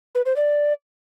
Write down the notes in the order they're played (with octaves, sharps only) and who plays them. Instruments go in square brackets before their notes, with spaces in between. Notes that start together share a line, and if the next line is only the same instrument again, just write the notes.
[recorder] B4
C5
D5